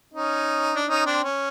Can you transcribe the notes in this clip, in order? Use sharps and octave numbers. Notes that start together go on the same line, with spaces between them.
C#4 D#4
D4
C#4 D#4
C4 D4
C#4